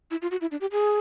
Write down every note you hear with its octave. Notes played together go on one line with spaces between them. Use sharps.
E4
F4
F#4
E4
D4
G4
G#4